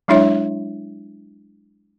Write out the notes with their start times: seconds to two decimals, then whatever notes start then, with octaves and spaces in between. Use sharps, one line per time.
0.08 F#3 G#3 D4 E4 C#5 E5